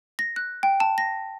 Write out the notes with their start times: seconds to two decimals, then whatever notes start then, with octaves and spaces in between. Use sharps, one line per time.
0.19 A#6
0.36 F#6
0.63 G5
0.80 A5
0.98 A#6